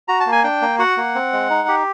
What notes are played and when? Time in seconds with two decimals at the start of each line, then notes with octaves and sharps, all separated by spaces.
0.08 F#4 A#5
0.20 A5
0.26 A#3
0.32 G#5
0.44 D4 G5
0.62 A#3
0.79 F#4 F#5
0.97 A#3
1.15 C4
1.33 G#3
1.50 D#4
1.68 G4